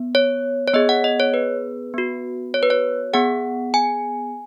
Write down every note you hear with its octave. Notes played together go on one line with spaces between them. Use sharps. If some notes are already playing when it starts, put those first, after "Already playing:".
Already playing: B3
C#5
C#5
B3 G#4 D#5
F#5
D#5
C#5
B4
B3 F#4
C#5
B4
C#5
B3 G#4 F#5
G#5